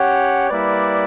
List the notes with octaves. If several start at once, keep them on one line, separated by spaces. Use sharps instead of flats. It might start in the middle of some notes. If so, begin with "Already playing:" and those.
Already playing: C#4 G4 C#5 F#5
G3 A#3 E4 B4 D5